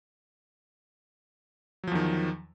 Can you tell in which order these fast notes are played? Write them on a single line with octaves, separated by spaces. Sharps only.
F#3 F3 E2 D#3